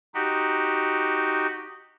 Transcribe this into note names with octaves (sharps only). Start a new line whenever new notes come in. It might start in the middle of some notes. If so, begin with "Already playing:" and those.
D#4 F#4 G4